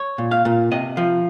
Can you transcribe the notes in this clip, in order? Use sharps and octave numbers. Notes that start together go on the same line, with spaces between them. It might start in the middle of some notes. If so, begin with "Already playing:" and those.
Already playing: C#5
A#2
F5
A#2
C3 D#5
F3